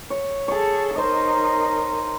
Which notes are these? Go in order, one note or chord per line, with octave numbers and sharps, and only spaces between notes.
C#5
G#4 A4 C#5 A5
D#4 A#4 C5 D#5